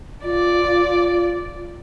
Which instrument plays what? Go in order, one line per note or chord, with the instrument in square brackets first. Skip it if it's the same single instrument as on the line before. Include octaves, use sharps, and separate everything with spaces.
[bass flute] F4 [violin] D5